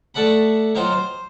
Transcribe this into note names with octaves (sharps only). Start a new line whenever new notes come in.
A3 A4 D5 F#5 B5
F#3 D#4 F4 C5 G5
C5